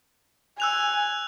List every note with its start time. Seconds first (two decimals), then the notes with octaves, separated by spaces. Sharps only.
0.60 G#5 E6 F#6 F7